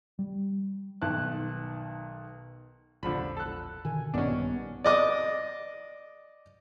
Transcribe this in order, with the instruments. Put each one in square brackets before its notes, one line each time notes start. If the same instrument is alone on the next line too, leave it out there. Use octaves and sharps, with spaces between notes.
[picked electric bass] G3
[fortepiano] B1 D#3 A5 F#6
[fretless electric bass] E1 A#1 [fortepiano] D3 F3 B5
[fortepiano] A4 F#6
[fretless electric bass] B2 D3 D#3 [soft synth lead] G#5
[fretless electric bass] A#1 G2 D#3 [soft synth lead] B3 [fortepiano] C#4 D4
[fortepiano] D5 D#5 D6